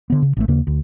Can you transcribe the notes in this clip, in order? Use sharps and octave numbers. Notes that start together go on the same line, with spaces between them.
D3 B3
C#3
A1 A3
D#2 C#3 A#3
D2